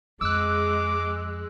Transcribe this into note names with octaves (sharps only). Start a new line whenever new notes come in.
F2 G#3 D6 E6 F#6